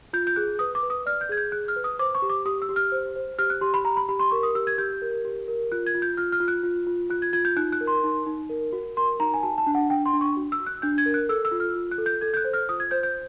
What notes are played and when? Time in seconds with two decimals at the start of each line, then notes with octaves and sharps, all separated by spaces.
0.13 F4 G6
0.27 G6
0.36 G#4 F#6
0.59 B4 D#6
0.75 D6
0.83 B4
0.90 D#6
1.06 D5 F6
1.21 G6
1.29 G#4 G#6
1.37 G6
1.52 G#4 F#6
1.68 F6
1.76 B4
1.84 D#6
1.99 C5 D6
2.15 C#6
2.22 G4
2.29 D6
2.45 G4 D#6
2.62 E6
2.69 G4
2.76 F6
2.92 C5
3.16 C5
3.38 G4 F6
3.50 F#6
3.61 G4 C6
3.74 B5
3.85 G4 A#5
3.97 B5
4.09 G4 B5
4.19 C6
4.31 A#4 C#6
4.43 D#6
4.55 G4 E6
4.67 G#6
4.78 G4 G6
5.02 A#4
5.25 G4
5.48 A#4
5.72 F4 F#6
5.87 G#6
5.94 F4
6.02 G6
6.17 F4 F6
6.32 F6
6.40 F4
6.48 F#6
6.63 F4
6.87 F4
7.10 F4 F#6
7.22 G#6
7.33 F4 G#6
7.45 G6
7.57 D#4 F#6
7.72 F#6
7.81 A#4
7.87 C6
8.04 D#4
8.27 D#4
8.49 A#4
8.73 F#4
8.97 A#4 C6
9.20 D#4 A#5
9.34 G#5
9.43 F#4 A5
9.58 A5
9.67 D4
9.75 F#5
9.90 D4 G5
10.06 C6
10.13 D4
10.21 C#6
10.37 F#4
10.52 E6
10.60 F#4
10.66 F#6
10.82 D4 G6
10.98 G#6
11.06 A#4
11.14 F#6
11.29 A4 E6
11.45 E6
11.52 F4
11.60 F6
11.75 F4
11.91 F#6
11.98 A4
12.06 G6
12.21 A4 G#6
12.34 G6
12.37 F#6
12.45 C5
12.54 F6
12.69 F4 D#6
12.80 G#6
12.91 C5 G6
13.03 G6